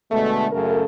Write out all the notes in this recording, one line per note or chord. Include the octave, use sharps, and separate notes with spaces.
B2 D3 G#3 A3
F#2 C#3 A3 A4 A#4